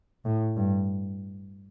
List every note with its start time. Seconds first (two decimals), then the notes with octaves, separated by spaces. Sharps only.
0.25 A2
0.57 G2